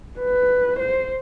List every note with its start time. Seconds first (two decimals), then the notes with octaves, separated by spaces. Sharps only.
0.20 B4
0.79 C5